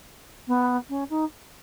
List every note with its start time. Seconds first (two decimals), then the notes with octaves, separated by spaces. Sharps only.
0.47 B3
0.89 C#4
1.09 D#4